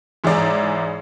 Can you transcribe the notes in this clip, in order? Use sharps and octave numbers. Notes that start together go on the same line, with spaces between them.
G#2 E3 G#4 C#5 D5 A#5